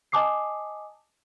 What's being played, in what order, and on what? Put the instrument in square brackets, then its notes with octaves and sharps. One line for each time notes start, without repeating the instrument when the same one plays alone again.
[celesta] D#5 G#5 A5 D6 D#6 C7